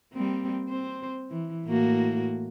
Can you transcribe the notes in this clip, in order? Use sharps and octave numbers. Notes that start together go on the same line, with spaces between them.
G3 A#3 C4
C4 C5
E3
A2 A#3 F#4